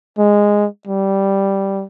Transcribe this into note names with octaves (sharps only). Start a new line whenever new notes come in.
G#3
G3